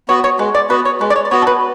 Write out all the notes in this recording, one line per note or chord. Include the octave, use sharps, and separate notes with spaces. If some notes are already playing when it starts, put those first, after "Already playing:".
B3 F#4 C#5
C#5
G#3 B4
D5
B3 F#4 B4
C#5
G#3 B4
D5
C#5
D5
B3 F#4 C#5
A4
B4